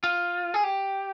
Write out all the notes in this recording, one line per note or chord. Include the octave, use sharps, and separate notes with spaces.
F4
G#4
G4